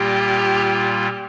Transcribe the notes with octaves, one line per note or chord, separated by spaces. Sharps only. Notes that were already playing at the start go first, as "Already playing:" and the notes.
Already playing: A#2 G3 A#3 F4 G4